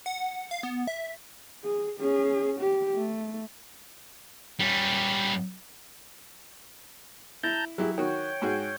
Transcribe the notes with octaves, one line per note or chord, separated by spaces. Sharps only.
F#5
F5
B3
E5
G#4
C#4 G#4
G4
A3
G3 C#4
E4 A5 A#5 G6
F#3 E4 G4 G#4
D#3 F#4 C#5 G5
G#2 F#4 G#4